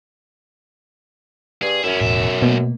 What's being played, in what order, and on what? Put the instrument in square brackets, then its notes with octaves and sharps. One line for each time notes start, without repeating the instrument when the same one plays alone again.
[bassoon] G2 [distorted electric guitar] G#4
[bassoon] F#2 [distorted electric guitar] C#4 E4
[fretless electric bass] E1 A2 [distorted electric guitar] B1 E5
[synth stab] B2 [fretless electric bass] A3 A#3